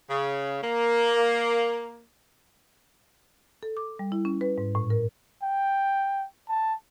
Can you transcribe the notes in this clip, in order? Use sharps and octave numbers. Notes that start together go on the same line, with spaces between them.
C#3
A#3
A4
D6
G3
E4
C#4
B4
G#2
A2
A#4
G5
A5